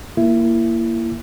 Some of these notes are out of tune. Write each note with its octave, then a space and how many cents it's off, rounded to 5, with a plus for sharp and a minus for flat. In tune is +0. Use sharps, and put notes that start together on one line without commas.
A#3 +5 E4 +20